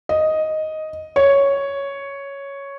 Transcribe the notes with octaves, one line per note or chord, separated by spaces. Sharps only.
D#5
C#5